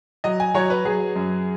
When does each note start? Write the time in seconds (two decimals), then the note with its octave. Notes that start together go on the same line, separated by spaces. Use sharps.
0.24 F#3 D#5
0.40 G#5
0.54 F#3 C#5
0.70 B4
0.85 F#3 G#4
1.16 F#2